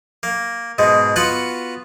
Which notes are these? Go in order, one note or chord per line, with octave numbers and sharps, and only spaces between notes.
A#3
G#2 B2 G#3
B3 F4 F#4 F#5 B5